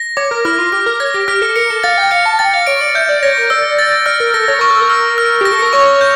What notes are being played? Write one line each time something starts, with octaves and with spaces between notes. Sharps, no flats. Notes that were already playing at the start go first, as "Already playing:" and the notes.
Already playing: A#6
C#5 D6
A#4
E4 F6
F4
G4 F6
A#4
C#5 A#6
G4
G4 F6
A4
A#4 C#7
A4
F5 A6
G5
F5 C#7
A5
G5 A6
F5
C#5 D7
D5
E5 G6
D5
C#5 A#6
A#4
D5 E6
A6
D5 F6
A#4
A4 A#6
C#5
A#4 C#6
A4
A#4
E6
F6
G4 A#6
A4
A#4
C#5 C#6
G6